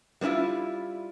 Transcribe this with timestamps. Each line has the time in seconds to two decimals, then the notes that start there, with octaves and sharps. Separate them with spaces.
0.21 G3 B3 C#4 E4 F4